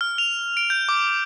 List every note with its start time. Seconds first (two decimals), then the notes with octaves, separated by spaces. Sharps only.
0.01 F6
0.18 F7
0.57 D7
0.70 G6
0.89 D6